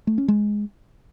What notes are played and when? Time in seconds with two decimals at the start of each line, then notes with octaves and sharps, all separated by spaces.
0.07 A3
0.18 C#4
0.28 G#3